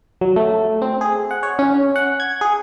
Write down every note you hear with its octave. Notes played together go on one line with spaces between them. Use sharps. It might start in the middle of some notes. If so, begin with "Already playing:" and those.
F#3
A3
C4
G#4
F#5
C#5
C#4
F#5
G#6
G#4